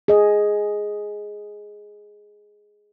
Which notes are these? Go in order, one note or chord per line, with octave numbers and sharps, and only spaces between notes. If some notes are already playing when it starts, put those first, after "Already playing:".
G#4 D#5